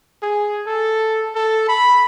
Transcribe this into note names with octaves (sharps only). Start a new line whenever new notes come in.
G#4
A4
A4
B5